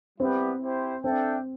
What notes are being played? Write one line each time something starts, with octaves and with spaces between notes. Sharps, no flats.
G3 B3 C4 E4 G4 B4
E4 G4 C5
C4 D4 A4 E5 G5